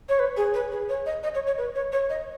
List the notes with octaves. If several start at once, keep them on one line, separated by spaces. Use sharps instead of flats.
C#5
B4
G#4
B4
G#4
C#5
D#5
D#5
C#5
C#5
B4
C#5
C#5
D#5